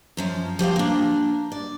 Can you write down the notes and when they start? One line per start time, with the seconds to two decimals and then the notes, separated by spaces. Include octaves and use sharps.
0.17 F#2 F3 C#4
0.59 F3 G4 C5 F5
0.76 A#3 D4
1.52 D5